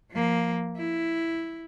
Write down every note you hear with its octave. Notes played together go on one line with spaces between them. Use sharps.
F3 A#3
E4